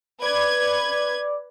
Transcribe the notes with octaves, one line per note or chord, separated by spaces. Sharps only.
B4 D5 D6 G#6